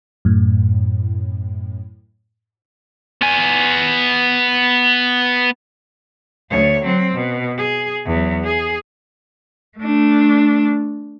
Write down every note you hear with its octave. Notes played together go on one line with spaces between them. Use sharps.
F#2 A2
B3 G#5
D2 C#5
F#3 C4
B2
G#4
E2 F#3
G#4
A3 D4